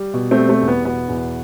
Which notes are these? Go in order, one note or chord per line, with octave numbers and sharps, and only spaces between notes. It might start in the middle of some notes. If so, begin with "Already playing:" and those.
Already playing: G3
B2
A3 C4
G3
A3 C4
E2
B3
B2 B3
E2